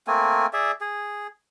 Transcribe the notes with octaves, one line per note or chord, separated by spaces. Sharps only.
A3 A#3 C4 G#5
G#4 D5 E5
G#4